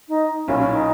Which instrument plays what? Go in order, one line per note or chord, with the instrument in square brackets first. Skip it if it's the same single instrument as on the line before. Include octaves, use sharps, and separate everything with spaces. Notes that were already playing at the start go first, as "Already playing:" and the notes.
[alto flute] D#4
[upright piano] B1 A#2 A#3 E4 [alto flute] C#4
[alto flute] C#4
D#4